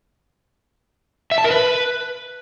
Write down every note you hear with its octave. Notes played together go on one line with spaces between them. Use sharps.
E5
A5
A#4
B4